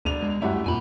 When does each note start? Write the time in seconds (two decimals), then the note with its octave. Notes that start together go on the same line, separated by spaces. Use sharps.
0.05 E1 D2 D4 D#7 F7
0.22 G#3
0.42 F#2 G3 A3 E4 F#5
0.66 F2 A#2 G#5 B5